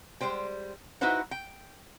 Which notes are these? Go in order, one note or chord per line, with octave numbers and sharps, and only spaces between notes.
G3 G#3 C5 G5
D#4 E4 F#4 B4 C5 F#5
G5